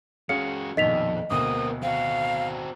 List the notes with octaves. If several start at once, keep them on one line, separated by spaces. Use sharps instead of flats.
G#3 C#4 F#4 G#4 F5 C#7
A#1 F2 B2 D#3 D#5 B6 F7
D2 B2 A#3 C4 D#6
C4 F#4 F5